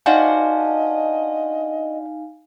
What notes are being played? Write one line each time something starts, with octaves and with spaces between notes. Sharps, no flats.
D4 D#4 F#4 C5 D#5 F5 G#5